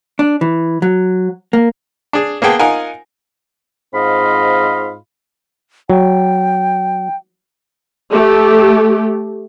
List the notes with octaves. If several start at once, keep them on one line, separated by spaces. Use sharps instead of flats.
D4
E3
F#3
A#3
D4 G#4
A#3 B3 G#4 G5 A5
D#4 F4 A#4 F#5 G#5
G#2 C4 F4 D#5 F5 B5
F#3 G5
A3 G4